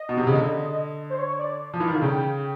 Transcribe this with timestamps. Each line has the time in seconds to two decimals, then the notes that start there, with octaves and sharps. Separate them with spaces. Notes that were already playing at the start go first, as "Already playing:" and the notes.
Already playing: D#5
0.09 B2
0.17 C3
0.27 C#3
0.35 D3
1.10 C5
1.19 C#5
1.39 D5
1.74 F3
1.80 E3 F5
1.88 D#3
1.94 D3
2.01 C#3 G5